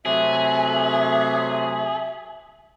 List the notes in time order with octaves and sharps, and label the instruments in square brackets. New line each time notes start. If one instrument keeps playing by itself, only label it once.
[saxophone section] C3 F#3 A3 [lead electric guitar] G#4 [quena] E5